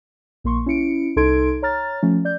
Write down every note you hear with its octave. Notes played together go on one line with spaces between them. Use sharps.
A#1 A#3 C6 C#6
C#4 E4 C#7 D7
C2 D#4 A4 C6 G#6 D7
C#5 A#5 F6 A6
F3 A3 C#4
D5 G6